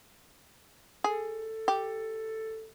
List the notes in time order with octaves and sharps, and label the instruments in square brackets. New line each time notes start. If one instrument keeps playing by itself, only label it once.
[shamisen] G#4 [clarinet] A4
[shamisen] G4